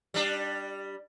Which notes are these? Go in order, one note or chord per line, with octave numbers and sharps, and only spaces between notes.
G3 D4